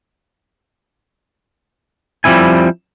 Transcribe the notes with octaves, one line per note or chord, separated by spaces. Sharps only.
F3 G3 C4 E4 G#5